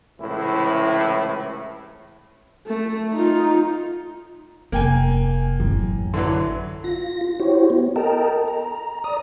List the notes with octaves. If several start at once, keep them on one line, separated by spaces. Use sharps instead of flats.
C#2 A2 C3 E3 E4
A3
D#4 F4
F1 A#3 G5 G#5
A1 F#2
D3 E3 F#3
F4 A#6
E4 F#4 G4 C5 C#5
B3
A4 A#4 D#5 G5 A5 A#5
A#5
D5 A#5 D#6